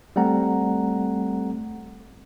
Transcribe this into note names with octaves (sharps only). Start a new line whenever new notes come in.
G3 A3 C4 A4 F#5 A#5